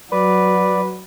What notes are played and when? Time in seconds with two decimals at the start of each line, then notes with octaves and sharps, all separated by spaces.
0.12 F#3 B4 D5